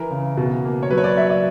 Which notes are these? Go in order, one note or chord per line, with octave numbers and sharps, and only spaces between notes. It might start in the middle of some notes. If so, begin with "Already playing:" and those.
Already playing: E3 A#4
C#3
B2
A#3
C#5
F#3 B4
C#5
D5
F#3 E5
D5